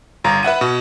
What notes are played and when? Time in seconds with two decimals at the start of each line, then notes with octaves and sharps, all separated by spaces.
0.24 G1 F4 A#5
0.43 B4 E5 F#5 D#7
0.61 B2